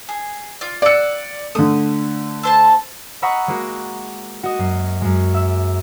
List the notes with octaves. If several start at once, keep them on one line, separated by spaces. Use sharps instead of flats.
G#4
F4 D5
D5 F#5 E6 C#7
D3 A3 D#6
A4 C5 A5
D#5 F#5 A#5 B5 C#6 E6
G#3 A#3 F#4
F#4 D#5
F#2 C7
F#2 G#3
E5 E6